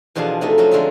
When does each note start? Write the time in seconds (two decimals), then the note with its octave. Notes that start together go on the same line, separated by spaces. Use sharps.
0.15 E2 B2 F3 D4 G#4 F5
0.41 C3 F3 A3 D#4 E5
0.58 F3 F#3 C#4 D#4 F#4
0.71 F2 D3 G#3 F4 E5 A#5